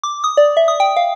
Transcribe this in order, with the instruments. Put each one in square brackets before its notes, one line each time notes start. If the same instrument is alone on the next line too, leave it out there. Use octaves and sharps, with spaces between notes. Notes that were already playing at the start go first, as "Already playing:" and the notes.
[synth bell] D6
D#6
D5
E5
D#6
G5
F5